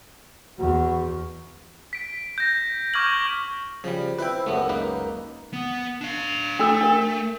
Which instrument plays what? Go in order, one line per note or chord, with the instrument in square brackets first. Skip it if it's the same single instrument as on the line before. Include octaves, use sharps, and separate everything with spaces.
[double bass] E2 [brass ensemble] F#4
[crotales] B6 D7
G6 A#6
C#6 D6 F6 G6 G#6 F#7
[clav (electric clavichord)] C#3 G3 [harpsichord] F3
[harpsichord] C4 E4 [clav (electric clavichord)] B4 G5
[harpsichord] C#2 F#2 [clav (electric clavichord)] A3 B3
[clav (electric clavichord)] A#3 D#4 B4
[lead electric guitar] B3
D4 F5
[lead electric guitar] A3 [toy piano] D4 A4 E6
[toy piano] D4 A#4